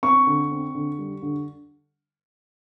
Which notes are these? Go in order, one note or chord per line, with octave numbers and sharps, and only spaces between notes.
C4 C#6
D3
C4
D3
G3
D3